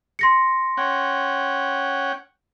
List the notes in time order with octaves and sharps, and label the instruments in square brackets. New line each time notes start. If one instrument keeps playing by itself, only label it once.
[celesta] C6 A#6 C#7
[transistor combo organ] C#4 F#5 G5